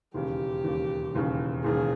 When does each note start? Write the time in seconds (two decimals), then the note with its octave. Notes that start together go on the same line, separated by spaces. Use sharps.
0.14 E1 D#2 C#3 G4
0.64 E1 D#2 C#3
1.15 E1 D#2 C#3
1.64 E1 D#2 C#3 G#4